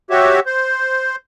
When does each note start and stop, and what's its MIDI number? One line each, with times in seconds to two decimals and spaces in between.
0.11 0.40 66
0.11 0.40 67
0.11 0.40 73
0.11 0.40 76
0.46 1.16 72